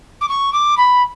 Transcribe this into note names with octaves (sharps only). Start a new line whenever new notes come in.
D6
C#6
D6
B5